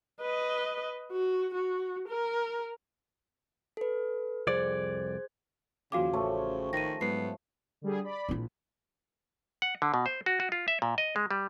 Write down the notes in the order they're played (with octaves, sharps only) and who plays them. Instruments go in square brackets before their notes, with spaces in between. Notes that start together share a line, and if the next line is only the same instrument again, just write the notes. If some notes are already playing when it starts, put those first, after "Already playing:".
[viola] B4 D#5
F#4
F#4
A#4
[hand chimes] A4 B4
[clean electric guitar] C2 F2 D5 [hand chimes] G#4 C5 G#6
[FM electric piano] D#2 F3 G#5 [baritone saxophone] C#3 [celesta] F#4 F5 D6 [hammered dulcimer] G4
[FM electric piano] A1 [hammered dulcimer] F3 A3 C#4
[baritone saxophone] D#3 [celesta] A#6 D#7
[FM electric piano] G#2 F#3 [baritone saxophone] B3 [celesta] C7
[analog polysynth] D3 G3 G#4
D5 B5
[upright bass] A#1 E4
[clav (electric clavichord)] F#5
D3
B2
C5
F#4
F#4
F4
E5
A#2
D#5
G#3
G3